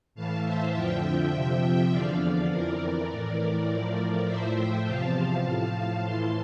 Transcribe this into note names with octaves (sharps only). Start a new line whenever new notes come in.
A2 E3 F5 A5
C5 E5
F2 D3 F3 E5 G5
F2 C3 F3
E2 D3 F3 D5 F5
F2 E3 A#4 D5
A2 E3
A2 F3
A2 F3 C5 E5
E5 G5
E2 C3 F3 F5 A5
A2 F3
A2 E3 A5 C6